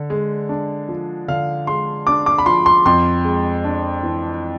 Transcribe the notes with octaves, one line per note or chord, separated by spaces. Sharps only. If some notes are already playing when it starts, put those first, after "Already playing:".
Already playing: D3
G#3
D4
F3
D3 F5
G#3 C6
D4 D6
D6
B5
F3 C6
C6
F2 C6
G#3
D4
E3